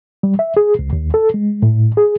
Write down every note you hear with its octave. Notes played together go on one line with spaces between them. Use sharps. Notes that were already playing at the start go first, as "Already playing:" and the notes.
G3
E5
G#4
C#2
D#2
A4
G#3
A2
G#4